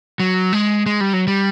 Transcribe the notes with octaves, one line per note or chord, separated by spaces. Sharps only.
F#3
G#3
G#3
G3
F#3
G3